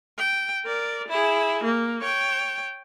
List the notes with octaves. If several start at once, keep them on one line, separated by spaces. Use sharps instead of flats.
G5
A#4 D5
E4 G#4
A#3
C#5 G5